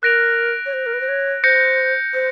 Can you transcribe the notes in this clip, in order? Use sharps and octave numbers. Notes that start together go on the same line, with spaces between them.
A#4 F#6 A#6 D7 F7
C#5
C5
A#4
B4
C5
C#5
C5 G6 A#6 C#7
C5